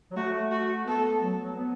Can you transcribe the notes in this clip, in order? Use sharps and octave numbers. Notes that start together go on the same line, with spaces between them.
F#3
A3 F#4
F#4
B3 A4
F#3
F#3
B3